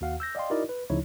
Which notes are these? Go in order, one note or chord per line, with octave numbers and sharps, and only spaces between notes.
D#2 F#4 F5 F#5
E6 G6 A#6
D5 D#5 F5 G5 C6
D#4 E4 F#4 A#4 D5 D#5
B4
D2 C#3 F3 D#4 E4 C#5